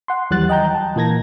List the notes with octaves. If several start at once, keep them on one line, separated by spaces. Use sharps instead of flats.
F#5 C6
D#2 E3 F#3 G3 F#6 A6
D#5 G5 A#5 G6
A5
A#2 E3 A#3 G#6 A#6